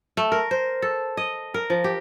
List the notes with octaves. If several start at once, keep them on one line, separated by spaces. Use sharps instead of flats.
A3
A#4
C5
A4
D#5
A#4
F3
G4